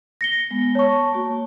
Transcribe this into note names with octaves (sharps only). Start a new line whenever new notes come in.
A#6 C#7 G7
G#3 B3
C#5 A5 C#6
A#3 F#4